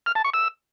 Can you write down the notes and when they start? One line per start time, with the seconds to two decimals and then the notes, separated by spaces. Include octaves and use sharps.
0.06 F6
0.15 A5
0.25 C#6
0.34 E6